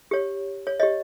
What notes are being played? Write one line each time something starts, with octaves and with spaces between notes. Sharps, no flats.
G4 C#5
C#5
G4 C#5 D#5